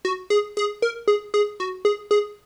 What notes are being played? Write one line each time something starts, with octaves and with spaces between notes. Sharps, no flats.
F#4
G#4
G#4
A#4
G#4
G#4
F#4
G#4
G#4